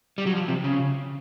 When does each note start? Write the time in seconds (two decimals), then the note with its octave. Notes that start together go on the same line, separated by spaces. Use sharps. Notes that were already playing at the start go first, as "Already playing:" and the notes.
0.18 G3
0.26 F#3
0.33 F3
0.48 C3
0.64 C#3